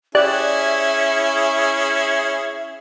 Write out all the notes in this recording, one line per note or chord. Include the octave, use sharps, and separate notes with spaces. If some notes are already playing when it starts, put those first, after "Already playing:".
C#4 E4 G4 G#4 D5 E5 F#6